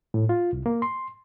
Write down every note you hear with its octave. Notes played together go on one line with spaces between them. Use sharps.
A2
F4
C2
A#3
C6